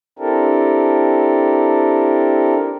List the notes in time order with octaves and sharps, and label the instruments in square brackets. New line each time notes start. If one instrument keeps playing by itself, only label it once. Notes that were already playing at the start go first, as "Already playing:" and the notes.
[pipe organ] C4 D4 E4 G4 A4 A#4